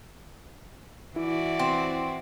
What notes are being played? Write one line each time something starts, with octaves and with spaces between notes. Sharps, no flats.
E3 E4 F#4 D5
C4